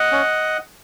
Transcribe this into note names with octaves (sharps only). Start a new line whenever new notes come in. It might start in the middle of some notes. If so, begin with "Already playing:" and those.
Already playing: D#5 F#5
C#4